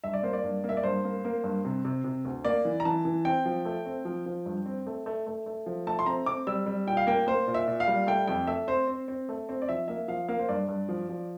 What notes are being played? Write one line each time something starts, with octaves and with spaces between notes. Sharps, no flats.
G2 E5
D5
A#3 C5
D5
G2
A#3
E5
D5
G2 C5
A#3
A#3
G2
C3
C3
C3
D2
A#3 D5
E3
A#5
E3 A5
E3
C4 G5
F3
A3
C4
F3
F3
G2
C4
A3
A3
A3
A3
F3
A3 A5
C6
C4 A#5
C4 D6
G3 E6
G3
A#2 G5
F5
A#3 G5
A#3 C5
A#2
E5
A#2
F5
G3
A3 G5
F2 G5
A3 E5
C4 C5
C4
C4
A3
C4
D5
F3 E5
A#3 E5
F3 F5
A#3 F5
C5
G2 D5
G2
F3
F3